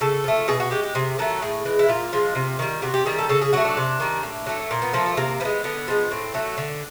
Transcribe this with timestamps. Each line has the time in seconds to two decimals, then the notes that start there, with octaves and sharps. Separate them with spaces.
0.01 C#3 A4
0.24 F3 A3
0.48 B2 G#4
0.60 F#4
0.71 G#3 G4
0.83 G4
0.95 C3 G#4
1.18 D#3 F#3 A3 A4
1.42 A2 G#4
1.65 E3 G#3
1.79 E4
1.88 A#2 F4
2.13 F3 G#3
2.35 C3
2.59 D#3 G3
2.82 C3 F#4
2.94 G4
3.06 D#3 G3 G#4
3.18 A4
3.29 C#3 A4
3.41 G#4
3.53 F#3 A3 F#4
3.65 D4
3.77 C3
4.00 D#3 G3
4.23 A2
4.46 F#3 A3
4.71 A#2
4.82 B3
4.93 F3 A3 A#3
5.06 A3
5.17 C3 A#3
5.40 F3 B3
5.45 G#3
5.64 D3 B3
5.88 F3 G#3
6.11 A2 C4
6.34 F#3 A3
6.58 D3